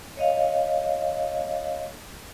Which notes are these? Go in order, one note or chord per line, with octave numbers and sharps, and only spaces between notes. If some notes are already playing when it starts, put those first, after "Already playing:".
C#5 D#5 F5